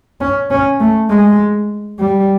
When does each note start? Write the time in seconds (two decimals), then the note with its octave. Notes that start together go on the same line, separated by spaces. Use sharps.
0.21 C#4
0.50 C#4
0.80 A3
1.10 G#3
1.99 G3